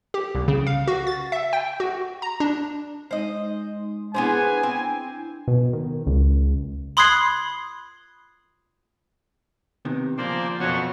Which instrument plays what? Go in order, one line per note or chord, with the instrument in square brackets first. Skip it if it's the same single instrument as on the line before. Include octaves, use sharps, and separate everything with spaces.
[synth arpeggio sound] G4
C2
C#3
F5
F#4
A6
E5
G5
F#4
A#5
D4
[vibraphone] G#3 D#4 [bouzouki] C5 D#5
[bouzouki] B3 G#4 C5 [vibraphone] D4 E4 [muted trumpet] G#5
[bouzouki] C4
[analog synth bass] B2
D#3
C#2
[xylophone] B5 C6 D#6 F#6 G#6 C7
[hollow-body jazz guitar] C3 D#3 B3
[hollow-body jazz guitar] A#2 C#3 F3 [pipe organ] A#3 C5 D5
[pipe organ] F2 [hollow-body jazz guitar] B2 C#4 [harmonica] F#3 F#4